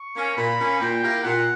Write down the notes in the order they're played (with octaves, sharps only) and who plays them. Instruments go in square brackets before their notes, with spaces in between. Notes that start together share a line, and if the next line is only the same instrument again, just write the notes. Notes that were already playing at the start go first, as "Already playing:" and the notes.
Already playing: [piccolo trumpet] C#6
[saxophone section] A#3 C#4
[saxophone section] A#2 [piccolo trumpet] B5
[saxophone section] A#3 C#4
[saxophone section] A#2 [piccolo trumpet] G5
[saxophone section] A#3 E4 G4 A#4
[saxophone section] A#2 [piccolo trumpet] F#5